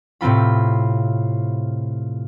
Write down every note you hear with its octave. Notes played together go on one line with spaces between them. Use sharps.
A2 C3 C4 F4 B5